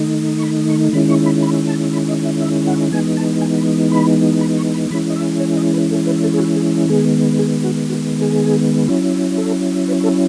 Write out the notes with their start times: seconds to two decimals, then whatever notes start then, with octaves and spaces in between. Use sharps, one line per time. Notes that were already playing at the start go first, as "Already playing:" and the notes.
Already playing: D#3 A3 D#4
0.38 C#6
0.43 B5
0.69 C#6
0.93 D#3 G#3 C#4 E4 B5
1.10 C#6
1.26 B5
1.43 B5
1.68 A5
1.93 B5
2.09 D#5
2.25 E5
2.42 E5
2.67 F#5
2.91 E3 G#3 B3 D#4 G#5
3.17 A5
3.41 G#5
3.58 B5
3.92 B5
4.41 B5
4.57 C#6
4.74 B5
4.90 E3 G#3 C#4 E4 B5
5.10 D#5
5.16 E5
5.40 C#5
5.57 D#5
5.73 B4
5.91 A4
6.06 B4
6.23 A4
6.34 G#4
6.39 F#4
6.56 G#4
6.89 D#3 G#3 B3 G#4
7.39 G#4
7.64 F#4
7.89 F#4
8.22 G#4
8.88 F#3 C#4 E4
9.38 A4
9.88 B4
10.04 A4